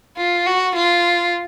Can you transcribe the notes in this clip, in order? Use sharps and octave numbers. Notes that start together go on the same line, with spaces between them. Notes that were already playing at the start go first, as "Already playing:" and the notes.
F4
F#4
F4